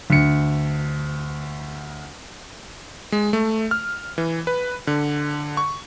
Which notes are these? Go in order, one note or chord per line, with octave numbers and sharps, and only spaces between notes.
D2 C#7
G#3
A3
F6
E3
B4
D3
C#6